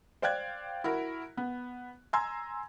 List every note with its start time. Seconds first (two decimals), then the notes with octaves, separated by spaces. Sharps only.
0.22 C5 D5 F5 G5 F#6 G#6
0.84 E4 F#4 A#4
1.37 B3
2.13 G#5 A#5 C6 E6 G#6